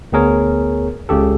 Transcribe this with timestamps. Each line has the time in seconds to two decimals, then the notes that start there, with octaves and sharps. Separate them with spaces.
0.12 D2 B3 G#4 A#4 C#5
1.09 C#2 C#3 G4 A4